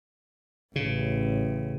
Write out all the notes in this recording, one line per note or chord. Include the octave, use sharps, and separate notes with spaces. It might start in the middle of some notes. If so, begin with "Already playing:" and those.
A1 C#3